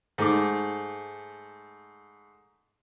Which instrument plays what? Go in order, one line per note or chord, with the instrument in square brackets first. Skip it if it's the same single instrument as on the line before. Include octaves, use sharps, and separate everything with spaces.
[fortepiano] G#2 A3 D6